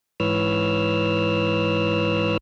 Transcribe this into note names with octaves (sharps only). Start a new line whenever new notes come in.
G#2 E3 B4 C#5 E6 F6